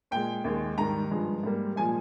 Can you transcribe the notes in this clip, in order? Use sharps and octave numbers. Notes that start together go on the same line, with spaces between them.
A#2 G#3 G5
D#2 D#3 G#3
G#2 D#3 G3 A#5
G2 F3 G#3
G#2 G3 A#3
A#2 F3 G#3 G#5